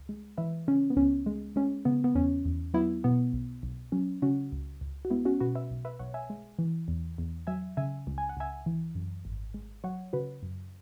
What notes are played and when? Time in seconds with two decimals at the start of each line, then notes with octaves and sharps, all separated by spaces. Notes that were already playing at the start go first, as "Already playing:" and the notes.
Already playing: C#2
0.09 G#3
0.38 E3 B4 E5
0.67 C#3 C#4
0.90 B3
0.97 C#2 C#4
1.26 G#3
1.56 G#3 C#4
1.85 C#3 B3
2.04 B3
2.15 E2 C#4
2.45 E2
2.74 F#3 B3 E4
3.04 B2 B3
3.33 B1
3.63 B1
3.92 F#3 C#4
4.22 C#3 C#4 F#4
4.52 C#2
4.81 C#2
5.05 F#4
5.10 G#3 B3 E4
5.25 C#4 F#4
5.40 B2 F#4 B4
5.55 B4 E5
5.71 B1
5.85 B4 E5
5.99 B1 C#5 F#5
6.14 E5 G#5
6.30 G#3
6.59 E3
6.88 E2
7.18 E2
7.47 F#3 E5 G#5
7.77 C#3 E5 G#5
8.07 C#2
8.18 G#5
8.29 F#5
8.37 C#2 E5 G#5
8.66 E3
8.95 F#2
9.25 G#1
9.54 G#3
9.84 F#3 C#5 F#5
10.13 C#3 F#4 B4
10.43 F#2